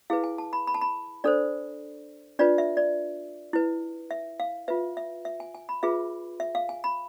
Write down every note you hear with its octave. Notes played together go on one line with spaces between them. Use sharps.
E4 G#4 B4 F5
G#5
A5
B5
B5
A5
B5
D4 A4 C5 D5
D4 F4 B4 D5
E5
D5
E4 B4
E5
F5
F4 B4 E5
E5
E5
G#5
G#5
B5
F4 G#4 B4 E5
E5
F5
G#5
B5